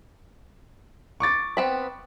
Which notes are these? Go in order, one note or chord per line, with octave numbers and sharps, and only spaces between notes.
C#6 D6 A6
B3 C4 B5